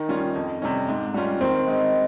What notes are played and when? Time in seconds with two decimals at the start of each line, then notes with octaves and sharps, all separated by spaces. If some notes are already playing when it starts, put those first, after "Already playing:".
Already playing: D#3 D#4
0.09 G3 C#4 F4
0.36 F2
0.62 C3 G3 C#4
0.89 G#2
1.14 G3 C#4 F4
1.41 D#3 C4
1.67 G#3 D#4